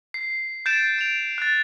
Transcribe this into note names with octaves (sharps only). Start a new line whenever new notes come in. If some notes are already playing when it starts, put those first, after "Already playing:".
C7
G6 A6 C7 D7 E7
D7 F7
F#6 A6